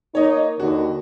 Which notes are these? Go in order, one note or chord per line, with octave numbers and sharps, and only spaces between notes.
A#3 D#4 C#5 D#5
D#2 D3 F#4